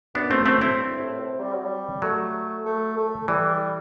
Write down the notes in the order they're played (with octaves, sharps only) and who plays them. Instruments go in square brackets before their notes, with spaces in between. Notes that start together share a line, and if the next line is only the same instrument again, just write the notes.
[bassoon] F#2 [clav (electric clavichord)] B3 D4
[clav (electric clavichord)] A3 C4
A3 C4
C4 E4
[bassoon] G2
A2
C3
G3
F#3
G3
[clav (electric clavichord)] F#3 [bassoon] A3
[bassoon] A3
A3
[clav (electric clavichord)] E3 [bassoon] G3
[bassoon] G3